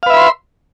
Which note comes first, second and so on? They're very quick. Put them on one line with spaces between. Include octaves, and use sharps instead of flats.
F5 B4 E5 B5 C6